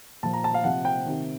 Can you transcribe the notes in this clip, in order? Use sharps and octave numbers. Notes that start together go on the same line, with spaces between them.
A#2 F3 A5
A#5
A5
F5
C3 F3 F#5
G5
C3 D#3